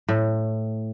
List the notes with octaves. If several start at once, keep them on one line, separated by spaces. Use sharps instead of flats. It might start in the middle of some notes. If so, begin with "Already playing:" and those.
A2